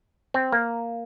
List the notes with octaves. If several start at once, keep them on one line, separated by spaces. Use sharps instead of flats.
C4
A#3